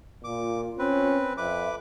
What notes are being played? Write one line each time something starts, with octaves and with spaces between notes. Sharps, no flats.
A#2 F4 D6
C4 C#4 B4
F2 B4 E5 D6